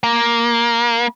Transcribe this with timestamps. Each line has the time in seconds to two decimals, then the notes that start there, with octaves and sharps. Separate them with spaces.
0.03 A#3